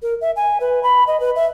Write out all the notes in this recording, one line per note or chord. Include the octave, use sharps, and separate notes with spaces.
A#4
E5
G#5
B4
B5
D#5
B4
E5